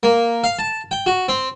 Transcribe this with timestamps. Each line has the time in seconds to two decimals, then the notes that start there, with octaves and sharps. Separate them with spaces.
0.03 A#3
0.44 F5
0.59 A5
0.91 G5
1.06 F#4
1.28 C4